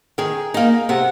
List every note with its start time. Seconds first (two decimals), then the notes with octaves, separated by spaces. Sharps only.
0.18 D#3 G#4
0.54 A#3 D#4
0.89 C3 F#5